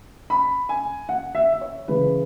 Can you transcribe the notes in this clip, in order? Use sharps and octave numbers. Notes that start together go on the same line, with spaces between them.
B5
G#5
F#5
E5
E5
C#5
C#3 E3 G#3 B4